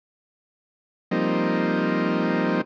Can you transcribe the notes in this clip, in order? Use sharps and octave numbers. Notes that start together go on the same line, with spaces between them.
F3 G3 A#3 C4 D#4